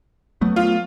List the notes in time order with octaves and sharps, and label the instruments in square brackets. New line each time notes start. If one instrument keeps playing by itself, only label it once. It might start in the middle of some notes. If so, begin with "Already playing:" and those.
[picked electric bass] F#3 A3 B3
[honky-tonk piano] F4